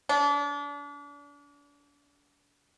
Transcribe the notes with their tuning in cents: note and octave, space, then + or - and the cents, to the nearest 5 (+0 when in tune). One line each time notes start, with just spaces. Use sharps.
D4 -35